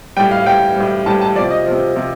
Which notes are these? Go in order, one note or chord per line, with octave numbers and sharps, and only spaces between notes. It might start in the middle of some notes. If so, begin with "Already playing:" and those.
A2 G3 G5
F5
A2 G3 G5
A2 G3
A2 G3 A5
A5
C3 F3 D5
D#5
C3 F3
C3 F3